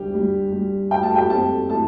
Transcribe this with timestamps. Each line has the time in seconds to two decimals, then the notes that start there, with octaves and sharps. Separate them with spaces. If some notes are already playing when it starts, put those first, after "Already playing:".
Already playing: D2 G3 G4
0.14 G3
0.52 G3
0.91 A3 G5
1.03 A5
1.15 G4 G5
1.30 C4 A4 A5
1.69 E3 A4 A5